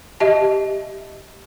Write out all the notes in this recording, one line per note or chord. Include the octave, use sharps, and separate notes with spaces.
G4 D#5 E5 A5